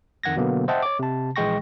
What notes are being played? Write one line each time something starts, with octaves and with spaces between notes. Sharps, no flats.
F2 D#3 F#5 G#6 A#6
B2 D3 F#3 A#3 B3
C5 D#5 E5 F#5 G5 A5
C#5 D6
C3 A5
A#1 E3 G#3 G5 C#6 A#6